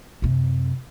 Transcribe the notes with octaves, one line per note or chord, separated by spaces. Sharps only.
F#2 C3